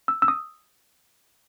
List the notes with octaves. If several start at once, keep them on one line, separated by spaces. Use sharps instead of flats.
E6
E6
D#6